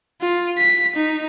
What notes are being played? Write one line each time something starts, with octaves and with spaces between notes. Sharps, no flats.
F4
B6
D#4